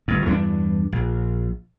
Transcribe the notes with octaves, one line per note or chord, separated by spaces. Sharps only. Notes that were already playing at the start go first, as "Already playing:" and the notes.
G1 G2
E2 G2 C4 D4
A#1